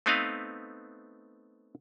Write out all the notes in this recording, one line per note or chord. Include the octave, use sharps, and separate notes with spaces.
A3 B3 C4 D#4 B4 F5